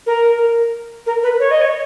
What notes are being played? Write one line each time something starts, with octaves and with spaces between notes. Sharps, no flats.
A#4
A#4
B4
C#5
D#5
C#5